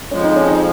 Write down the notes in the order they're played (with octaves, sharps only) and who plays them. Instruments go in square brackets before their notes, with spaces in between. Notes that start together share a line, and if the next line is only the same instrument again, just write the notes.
[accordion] F2 F3 G#3 [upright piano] C#4
[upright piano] D#4
C#4
D#4